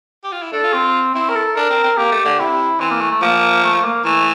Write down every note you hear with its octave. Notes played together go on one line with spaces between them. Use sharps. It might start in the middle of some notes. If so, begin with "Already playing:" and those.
G4
F4
E4
D4 A4
F4
C4
C4 E4
A#4
A4
D4 A#4
C4
C4
A#3 G4
A3
D3
C3 E4
E3 C4
A#3
A3
A3
F3 A#3
A3
A#3
E3 A3